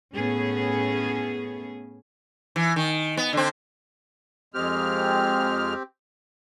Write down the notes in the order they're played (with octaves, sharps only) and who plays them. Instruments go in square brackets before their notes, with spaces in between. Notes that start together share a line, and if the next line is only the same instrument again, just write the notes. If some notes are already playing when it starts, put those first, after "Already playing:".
[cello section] A2 B3 C#4 G#4
[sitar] E3
D#3
B3
D3 C4
[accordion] F2 G#3 F6 [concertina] C4 G4